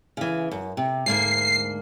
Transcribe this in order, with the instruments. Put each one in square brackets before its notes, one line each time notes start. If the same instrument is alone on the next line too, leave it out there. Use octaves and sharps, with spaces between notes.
[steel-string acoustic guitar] C#3 E3
F#2
C3
[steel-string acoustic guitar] D2 G#2 A#3 [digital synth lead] C7